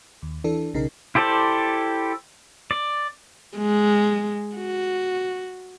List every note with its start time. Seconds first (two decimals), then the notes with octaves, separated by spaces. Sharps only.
0.22 D#2
0.44 E3 D4 A4
0.74 B1 C#3 D#4 A#4 C7
1.15 E4 G4 A4 C5 D5
2.71 D5
3.57 G#3
4.56 F#4